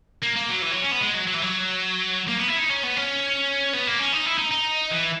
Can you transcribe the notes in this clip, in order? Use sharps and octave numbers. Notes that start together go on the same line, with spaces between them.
A#3
A#3
F#3
E3
F#3
C#4
B3
G#3
F#3
F#3
E3
F#3
A#3
B3
E4
D#4
C#4
B3
C#4
B3
A#3
C#4
D#4
E4
D#4
D#4
E3